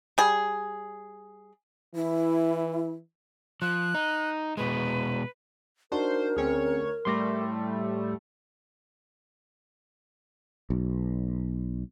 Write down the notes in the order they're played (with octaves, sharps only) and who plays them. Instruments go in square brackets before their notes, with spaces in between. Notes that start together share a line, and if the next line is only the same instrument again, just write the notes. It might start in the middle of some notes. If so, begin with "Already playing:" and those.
[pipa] G3 G#4
[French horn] E3 [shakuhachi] E4
[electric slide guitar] F3 [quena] F#6
[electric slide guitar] D#4
[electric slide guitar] B2 G#3 [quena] B4
[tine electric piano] D4 D#4 F#4 [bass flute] A#4 [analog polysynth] C5
[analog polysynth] D2 C#5 [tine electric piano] C4 C#4 G#4
[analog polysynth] A2 G3 A3 [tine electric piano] C6 D6 A#6
[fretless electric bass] B1